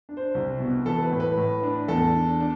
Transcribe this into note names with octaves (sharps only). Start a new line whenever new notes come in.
D4
C5
C2
B2
E3 A4
B4
A2
B4
A2
D4
E2 A4
D4
D4